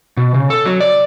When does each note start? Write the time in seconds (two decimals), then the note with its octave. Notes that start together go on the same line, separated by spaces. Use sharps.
0.17 B2
0.34 C#3
0.50 A4
0.66 F#3
0.80 D5